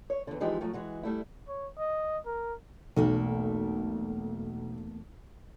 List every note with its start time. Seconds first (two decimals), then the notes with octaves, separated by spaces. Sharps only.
0.10 C#5
0.27 E2 D3
0.41 E3 F3 G#3 D#4 G4
0.61 F3 F#3 A3
0.73 E3 G#3 F#4
1.03 G3 A3 E4
1.48 C#5
1.79 D#5
2.26 A#4
2.96 B1 E2 A3 A#3